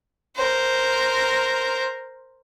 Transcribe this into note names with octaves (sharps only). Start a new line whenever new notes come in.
A#4 C5